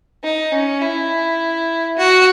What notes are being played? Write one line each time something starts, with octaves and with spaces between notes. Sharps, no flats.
D#4
C#4
E4
F#4